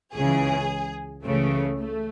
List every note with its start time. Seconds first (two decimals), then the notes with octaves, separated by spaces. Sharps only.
0.15 C#2 C#3 E3 G#4
1.24 C#2 C#3 E3 A3
1.80 A3